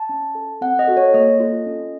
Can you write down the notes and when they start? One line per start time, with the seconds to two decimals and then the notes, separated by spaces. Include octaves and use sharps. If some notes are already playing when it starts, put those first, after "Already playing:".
Already playing: A5
0.09 C#4
0.35 A4
0.61 C4 F#5
0.79 D#5
0.87 F#4 A4
0.97 C#5
1.14 A#3 D#5
1.40 F4 A4
1.66 C#4